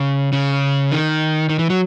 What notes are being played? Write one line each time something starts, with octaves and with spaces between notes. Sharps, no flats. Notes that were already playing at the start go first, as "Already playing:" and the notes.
Already playing: C#3
C#3
D#3
D#3
E3
F#3